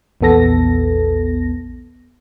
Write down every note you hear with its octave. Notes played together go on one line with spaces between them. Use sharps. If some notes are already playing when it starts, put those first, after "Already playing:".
A#1 E2 B3 A4 A#6